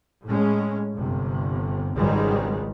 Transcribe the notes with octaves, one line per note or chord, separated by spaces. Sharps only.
A2 G#3 C#4
G1 C3
G#1 C#2 G#2 D#3 G3 G#3